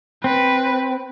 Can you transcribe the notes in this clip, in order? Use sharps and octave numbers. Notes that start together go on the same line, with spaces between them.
C4 B4